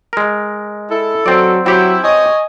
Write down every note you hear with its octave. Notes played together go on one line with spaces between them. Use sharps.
G#3 A#4
E4 A4
F#3 C4 D5
F#3 C4 E4 G4
C#5 D#5 G#5